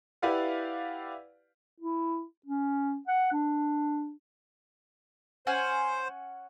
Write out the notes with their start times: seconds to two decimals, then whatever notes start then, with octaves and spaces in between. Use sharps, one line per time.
0.22 E4 G4 B4 D5 F5 F#5
1.80 E4
2.46 C#4
3.07 F#5
3.32 D4
5.47 C#4 C5 F#5 G#5